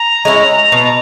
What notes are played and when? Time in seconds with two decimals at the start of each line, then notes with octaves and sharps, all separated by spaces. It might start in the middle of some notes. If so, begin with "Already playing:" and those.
Already playing: A#5
0.25 G#3 C#4 E4
0.72 B2